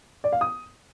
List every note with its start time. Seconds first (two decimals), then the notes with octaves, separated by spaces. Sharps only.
0.24 D5
0.32 F5
0.41 D#6